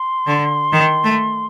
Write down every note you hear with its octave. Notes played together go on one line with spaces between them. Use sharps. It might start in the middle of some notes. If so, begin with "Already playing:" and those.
Already playing: C6
D3
D#3
A3